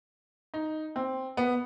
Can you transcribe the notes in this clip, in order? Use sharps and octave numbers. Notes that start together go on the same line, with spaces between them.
D#4
C4
B3